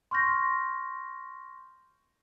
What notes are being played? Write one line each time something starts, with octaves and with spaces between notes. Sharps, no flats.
C6 C#6 F6 G6 A#6